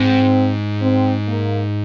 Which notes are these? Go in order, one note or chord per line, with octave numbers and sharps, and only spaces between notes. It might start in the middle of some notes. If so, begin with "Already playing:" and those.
Already playing: G#2 C4
C4
A#3